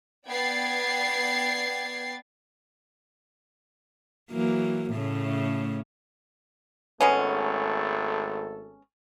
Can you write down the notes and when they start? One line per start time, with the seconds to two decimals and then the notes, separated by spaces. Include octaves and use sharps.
0.27 B3 D5 G5 G#6 A6 C7
4.31 E3 F#3 A#3
4.91 A2 C#3 A3
7.01 G#1 G#3 A3 B3 C#4 A4